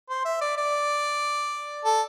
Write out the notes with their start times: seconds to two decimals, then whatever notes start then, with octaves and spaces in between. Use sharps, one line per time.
0.09 C5
0.25 E5
0.41 D5
0.57 D5
1.85 A4